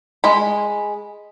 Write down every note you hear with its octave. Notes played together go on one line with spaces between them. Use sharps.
G#3 B5